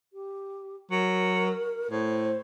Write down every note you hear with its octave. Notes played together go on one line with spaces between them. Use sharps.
G4
F#3 A#4
A2 C5